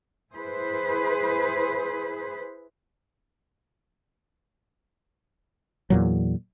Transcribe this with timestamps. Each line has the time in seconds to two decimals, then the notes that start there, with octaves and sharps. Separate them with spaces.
0.32 E4 G#4 B4 C5
5.90 E2 A#2 F#3